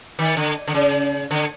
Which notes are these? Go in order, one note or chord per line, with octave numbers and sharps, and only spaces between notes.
D#3
D3
D3
C#3
D3